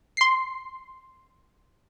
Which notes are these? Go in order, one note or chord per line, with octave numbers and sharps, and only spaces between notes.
C6 C7